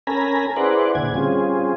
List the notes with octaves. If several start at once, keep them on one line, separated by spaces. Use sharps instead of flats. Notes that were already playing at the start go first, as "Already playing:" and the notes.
C#4 A4 A#4 G#5 A#5 B5
E4 G#4 B4 C5 D5 F#5
A#2 D3 G#6
G3 C4 C#4 F4 G#4